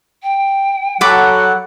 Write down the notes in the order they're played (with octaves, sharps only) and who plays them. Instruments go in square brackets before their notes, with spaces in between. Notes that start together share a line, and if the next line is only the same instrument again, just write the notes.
[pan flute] G5
[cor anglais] F#3 [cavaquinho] A4 B5 D6 [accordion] F#5